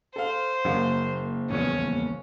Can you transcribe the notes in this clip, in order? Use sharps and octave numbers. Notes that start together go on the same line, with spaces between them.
A4 C5 F5
F#1 F#2 A#3 F5
D#1 A#1 E2 C#4